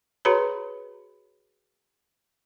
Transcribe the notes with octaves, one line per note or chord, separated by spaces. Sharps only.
F#4 G#4 B4 C#5 A#5 B5